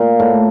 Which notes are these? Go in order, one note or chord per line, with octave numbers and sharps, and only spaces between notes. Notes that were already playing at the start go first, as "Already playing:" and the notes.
Already playing: A#2
A2